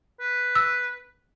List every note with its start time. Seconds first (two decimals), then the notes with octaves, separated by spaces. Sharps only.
0.20 B4
0.55 E6